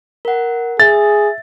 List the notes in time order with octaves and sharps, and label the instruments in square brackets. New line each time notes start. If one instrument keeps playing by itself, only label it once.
[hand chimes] A#4 F#5
[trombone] G#4 [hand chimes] E5 [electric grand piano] A6